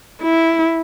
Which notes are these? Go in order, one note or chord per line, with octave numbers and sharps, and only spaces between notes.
E4